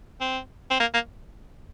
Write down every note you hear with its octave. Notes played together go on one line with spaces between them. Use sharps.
C4
C4
A#3
A#3